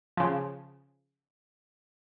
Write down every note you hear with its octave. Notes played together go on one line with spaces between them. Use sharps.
C#3 F3